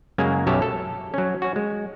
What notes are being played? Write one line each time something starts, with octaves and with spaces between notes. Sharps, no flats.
F#2 C#3 G#3 A#3 G#5
B1 F#2 G4 C#5 E5 A5
A4
F#3 C#4
C#4 F#4
G#3